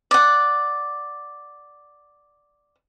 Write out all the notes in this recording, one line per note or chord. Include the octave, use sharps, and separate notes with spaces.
D5 F#5